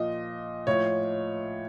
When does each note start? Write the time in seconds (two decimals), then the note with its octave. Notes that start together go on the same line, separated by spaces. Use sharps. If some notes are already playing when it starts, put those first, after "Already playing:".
Already playing: A#2 F3 D#5
0.67 A2 F3 C#5